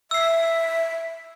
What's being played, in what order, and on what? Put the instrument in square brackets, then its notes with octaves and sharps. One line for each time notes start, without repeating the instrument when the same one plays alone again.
[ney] E5 [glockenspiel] E6 C7